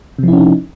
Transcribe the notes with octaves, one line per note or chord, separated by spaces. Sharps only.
C3 F3 C#4 D#4 E4